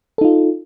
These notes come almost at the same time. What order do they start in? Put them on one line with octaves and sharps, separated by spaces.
A4 D#4 F4